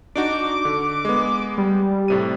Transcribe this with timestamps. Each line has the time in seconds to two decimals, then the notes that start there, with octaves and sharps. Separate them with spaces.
0.16 D4 D#4 F#4 D6
0.65 D3
1.05 G#3 B3
1.58 G3
2.08 A2 C3 D#7